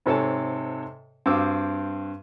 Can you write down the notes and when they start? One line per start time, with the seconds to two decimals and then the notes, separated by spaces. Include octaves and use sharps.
0.06 G#2 C3 A4 C#5 G#5 A5
1.26 G2 C4 F#4 F5 D6 E6